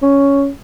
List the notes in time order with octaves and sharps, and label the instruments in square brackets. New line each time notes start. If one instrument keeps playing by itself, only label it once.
[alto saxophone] C#4